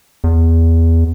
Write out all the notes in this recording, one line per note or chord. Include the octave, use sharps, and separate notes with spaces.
E2